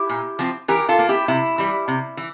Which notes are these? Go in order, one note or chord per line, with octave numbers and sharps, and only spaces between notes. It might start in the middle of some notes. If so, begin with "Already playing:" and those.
Already playing: E4 G4
A#2
F3 C4
E3 G4 A#4
F4 A4
A#3
E4 G4
C3 E4
E3 G3
C3
E3